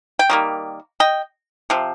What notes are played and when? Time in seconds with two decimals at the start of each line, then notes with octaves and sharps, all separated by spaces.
0.19 G5
0.30 D#3 G3 A#3
1.00 D#5 G5
1.70 C3 F3